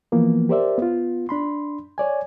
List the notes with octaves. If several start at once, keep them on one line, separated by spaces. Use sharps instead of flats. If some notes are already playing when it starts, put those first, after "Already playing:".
E3 F3 A#3 B3
G4 A#4 C5 D5 E5
B3 F4
D4 B5 C6
C#5 D5 G#5